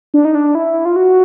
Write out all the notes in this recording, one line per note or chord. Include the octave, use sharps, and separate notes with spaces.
D4
D#4
D4
E4
F4
F#4